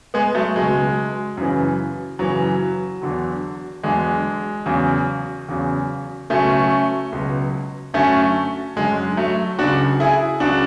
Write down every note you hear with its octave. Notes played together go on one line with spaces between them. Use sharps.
G#3 B3
F#3 A3
C#2 B2 F#3 G#3
F#2 C#3 E3
F#2 C#3 E3 F#3
E2 D3 F#3
E2 D3 F#3 G#3
E2 C#3 F#3
E2 C#3 F#3
C#2 B2 F#3 A3 C#4
C#2 B2 F#3
F#2 D3 F#3 A3 C#4
F#2 D3 F#3 G#3
F#3 A3
C#2 C#3 F#3 D4 F#4
E4 G#4
C#2 C#3 F#3 D4 F#4